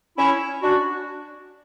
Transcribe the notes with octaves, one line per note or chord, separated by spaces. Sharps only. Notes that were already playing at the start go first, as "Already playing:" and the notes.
C#4 E4
D4 F#4